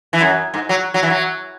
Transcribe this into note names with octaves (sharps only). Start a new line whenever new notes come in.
E3
F#2
G#2
F#3
F#3
E3
F#3